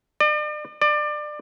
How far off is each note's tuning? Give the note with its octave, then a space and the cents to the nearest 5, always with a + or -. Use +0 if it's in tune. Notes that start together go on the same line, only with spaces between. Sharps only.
D5 +40
D5 +25